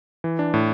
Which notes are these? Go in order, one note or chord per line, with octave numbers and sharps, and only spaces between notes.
E3
D4
A2